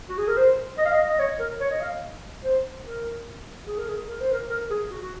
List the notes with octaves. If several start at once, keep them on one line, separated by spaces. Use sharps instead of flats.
F#4
G#4
A#4
C5
D#5
F5
D#5
D#5
C#5
A#4
C#5
D#5
F5
C5
A#4
G#4
A#4
G#4
A#4
C5
A#4
A#4
G#4
F#4
F#4